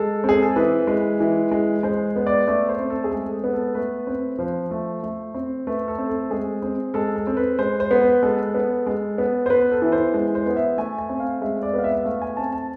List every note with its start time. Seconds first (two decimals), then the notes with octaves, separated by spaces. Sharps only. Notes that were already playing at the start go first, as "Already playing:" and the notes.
Already playing: G#3 A4
0.24 C4
0.29 G#4
0.42 A4
0.56 E3 B4
0.87 G#3
1.20 E3
1.51 G#3
1.83 G#3 C5
2.16 B3
2.27 D5
2.48 A3 D5
2.69 C5
2.79 C4
2.90 A4
3.04 G#4
3.11 G#3 A4
3.44 B3
3.54 A4
3.75 A3 B4
4.07 C4
4.39 F3 C5
4.71 A3
5.03 A3
5.34 C4
5.67 A3 B4
5.88 A4
5.98 C4
6.09 A4
6.30 G#3 G#4
6.62 C4
6.94 G#3 A4
7.16 A4
7.27 C4
7.37 B4
7.59 G#3 C5
7.80 C5
7.91 B3
8.01 B4
8.23 G#3 A4
8.54 B3
8.86 G#3
9.18 B3
9.46 C5
9.50 B3 B4
9.71 A4
9.82 E3
9.92 C5
10.14 G#3
10.35 C5
10.46 B3
10.56 E5
10.78 A3 G#5
10.99 G#5
11.09 C4
11.20 F5
11.42 G#3 E5
11.63 D5
11.73 B3
11.79 F5
11.84 E5
11.95 E5
12.05 A3 F5
12.22 G#5
12.37 C4 A5
12.53 A5